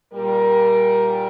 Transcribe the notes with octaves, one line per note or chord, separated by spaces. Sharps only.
A#2 G3 A#4